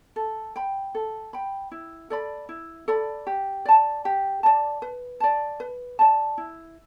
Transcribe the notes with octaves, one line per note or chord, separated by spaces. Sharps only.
A4
G5 B5
A4
G5 B5
E4
A4 D5 B5
E4
A4 D5 B5
G4
D5 A5
G4
D5 A5
B4
D5 A5
B4
D5 A5
E4